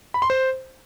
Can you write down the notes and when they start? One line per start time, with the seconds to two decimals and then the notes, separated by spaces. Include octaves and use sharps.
0.14 B5
0.22 C6
0.30 C5